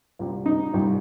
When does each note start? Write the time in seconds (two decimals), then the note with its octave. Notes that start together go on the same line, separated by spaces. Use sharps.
0.19 C2 A#2 G3
0.46 D#4
0.74 C2 A#2 G3